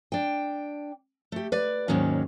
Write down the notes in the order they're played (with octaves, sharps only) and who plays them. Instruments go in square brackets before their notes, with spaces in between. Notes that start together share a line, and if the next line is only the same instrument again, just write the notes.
[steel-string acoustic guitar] D4 G5
A3 G4
B4 D5
D#2 G#2 D#3 F#3 A#3 C#4